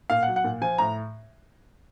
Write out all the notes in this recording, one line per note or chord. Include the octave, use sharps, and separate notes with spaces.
A#2 F5
F#5
F#3
F#5
A#2
F3 G#5
A2 A#5